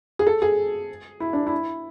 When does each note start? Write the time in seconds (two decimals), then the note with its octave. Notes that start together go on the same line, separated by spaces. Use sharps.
0.19 G#4
0.27 A4
0.42 G#4
1.20 E4
1.33 D4
1.47 E4